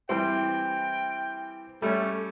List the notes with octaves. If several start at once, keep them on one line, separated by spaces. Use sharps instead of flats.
E3 G3 C4 G5
G3 A3 C#4